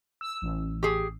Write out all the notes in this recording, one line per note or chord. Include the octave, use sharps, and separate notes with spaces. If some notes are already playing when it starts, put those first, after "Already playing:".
E6
A1
G4 G#4